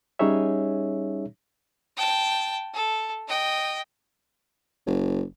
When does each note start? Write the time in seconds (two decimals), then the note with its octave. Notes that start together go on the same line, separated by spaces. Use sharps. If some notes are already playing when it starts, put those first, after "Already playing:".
0.19 G3 C#4 D#4 G#4 C#5 E5
1.97 G5 A5
2.74 A4
3.28 D#5 G5
4.87 F#1